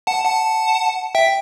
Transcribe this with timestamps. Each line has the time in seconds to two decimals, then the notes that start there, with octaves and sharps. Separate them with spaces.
0.07 F#5 A5
0.25 F#5 A5
1.15 E5 G5